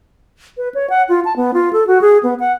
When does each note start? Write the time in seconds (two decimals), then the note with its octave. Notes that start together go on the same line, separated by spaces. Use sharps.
0.57 B4
0.75 C#5
0.90 F#5
1.09 F4
1.25 A5
1.36 B3
1.54 F4
1.73 A4
1.87 F#4
2.01 G#4
2.23 B3
2.40 F#5